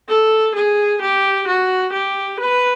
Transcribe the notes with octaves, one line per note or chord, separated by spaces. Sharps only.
A4
G#4
G4
F#4
G4
B4